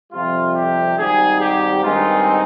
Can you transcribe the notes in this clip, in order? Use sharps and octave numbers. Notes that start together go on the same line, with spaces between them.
F2 C3 G3 F4
G4
G#1 G#2 G3 G#4
G4
G2 D#3 G#3 C4 D#4 F4